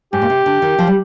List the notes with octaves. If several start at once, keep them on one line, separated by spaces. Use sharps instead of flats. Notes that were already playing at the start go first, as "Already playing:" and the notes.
G#2 G4
A#2
C3
D3
D#3
F3
G3